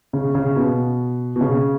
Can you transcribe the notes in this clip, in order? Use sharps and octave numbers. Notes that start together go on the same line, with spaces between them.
C#3
C#3
B2
B2
C#3